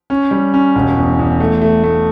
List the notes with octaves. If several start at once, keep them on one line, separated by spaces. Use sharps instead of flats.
C#4
G3
C#4
E1
E2
E2
A3
A3
A3